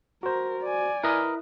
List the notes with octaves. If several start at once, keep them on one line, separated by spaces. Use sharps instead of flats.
F#4 A#4 C5
D5 G#5
E4 A#4 B4 D#5